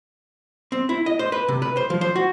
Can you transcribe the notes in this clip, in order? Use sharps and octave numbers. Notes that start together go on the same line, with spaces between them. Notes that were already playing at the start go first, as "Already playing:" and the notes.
C4
E4
D#5
C5
B4
C3
B4
C5
F3
C5
F#4